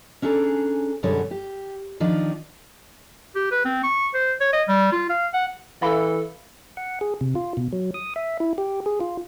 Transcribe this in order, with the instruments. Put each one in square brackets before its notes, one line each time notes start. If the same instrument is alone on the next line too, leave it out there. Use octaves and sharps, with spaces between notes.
[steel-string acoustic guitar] C#4 D4 G#4 A4 A#5
F#2 B2 D3 G3 G#4 C#5
G4
D#3 F3 D4 D#4
[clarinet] G4
B4
C4
C#6
C5
C#5
D#5
G3
F4
F5
F#5
[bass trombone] E3 [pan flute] A4 [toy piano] E5 F5 B5
[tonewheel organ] F#5
G#4
C3
F4
B2
F#3
D#6
E5
E4
G4
G#4
F4